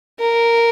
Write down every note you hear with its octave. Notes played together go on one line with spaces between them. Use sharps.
A#4